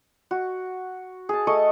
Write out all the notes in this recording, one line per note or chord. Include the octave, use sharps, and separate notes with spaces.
F#4
G#4 A5
A3 D#5 C#6 D#6